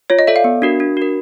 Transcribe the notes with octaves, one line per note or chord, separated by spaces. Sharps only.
F4 C#5
D#5
A4 D5 E5
F5
B3
D4 F#4 A#4
D4
F#4 A#4